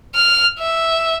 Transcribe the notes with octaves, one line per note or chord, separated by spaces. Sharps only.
F6
E5